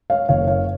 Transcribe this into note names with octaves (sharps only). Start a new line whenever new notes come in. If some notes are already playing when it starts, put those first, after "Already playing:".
C#5 F5
F#1 C#5 F5
C#5 F5